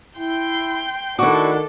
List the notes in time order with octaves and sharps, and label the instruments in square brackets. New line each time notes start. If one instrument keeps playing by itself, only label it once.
[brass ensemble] E4 [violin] G5 C6
[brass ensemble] D#3 A3 D4 [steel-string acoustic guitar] E4 F#4 [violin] A4 [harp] D6